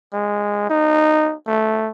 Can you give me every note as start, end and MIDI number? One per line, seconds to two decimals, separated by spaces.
0.13 0.65 56
0.69 1.35 63
1.47 1.91 57